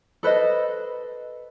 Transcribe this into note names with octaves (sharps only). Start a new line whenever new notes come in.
A4 B4 C5 D#5